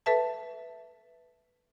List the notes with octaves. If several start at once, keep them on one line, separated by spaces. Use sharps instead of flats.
A4 B4 E5 A5